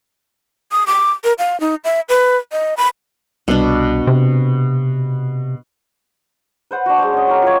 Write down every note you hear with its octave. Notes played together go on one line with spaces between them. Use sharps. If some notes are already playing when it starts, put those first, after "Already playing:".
D#6
D6
A#4
F5
D#4
E5
B4
D#5
B5
C2 B2 D4
C3
B4 C5 F#5
D4 F#4
G#3 C5
C#4 D#5
F#4 G4 A#4
F4 C#5